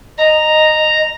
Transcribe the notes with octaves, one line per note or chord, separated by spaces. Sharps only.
D#5 A#5